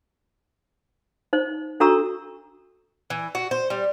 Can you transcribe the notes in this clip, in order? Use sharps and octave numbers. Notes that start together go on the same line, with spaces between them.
D#4 C5
D4 F#4 A4 A#5 C#6 E6
E3
F#4
C5
G3